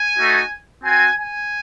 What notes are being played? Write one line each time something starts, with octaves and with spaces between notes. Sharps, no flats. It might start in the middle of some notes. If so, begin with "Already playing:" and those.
Already playing: G#5
A3 D#4 F#4
C4 F#4 G#5
G#5